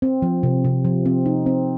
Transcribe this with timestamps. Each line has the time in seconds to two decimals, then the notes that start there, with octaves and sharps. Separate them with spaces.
0.02 C4
0.22 F3
0.43 C3
0.64 C3
0.84 F3
1.05 C4
1.26 D#4
1.46 C4